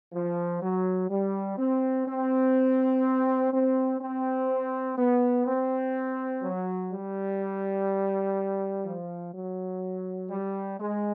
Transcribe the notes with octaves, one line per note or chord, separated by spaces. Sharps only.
F3
F#3
G3
C4
C4
C4
C4
B3
C4
F#3
G3
F3
F#3
G3
G#3